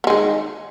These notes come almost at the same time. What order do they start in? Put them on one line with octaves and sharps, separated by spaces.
B3 G#3 D#3